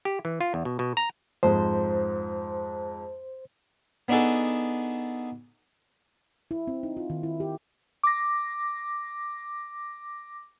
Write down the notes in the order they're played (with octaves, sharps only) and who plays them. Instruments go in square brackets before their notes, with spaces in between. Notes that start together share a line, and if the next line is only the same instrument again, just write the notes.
[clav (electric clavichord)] G4
E3
F4
E2
B2
B2
A#5
[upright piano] F2 G#2 [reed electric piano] C5
[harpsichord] B3 D4 D#4 F#4 G#4 A4
[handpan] E4
C4
D#4
F4
D#3
E4
G4
[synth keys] D6 A#6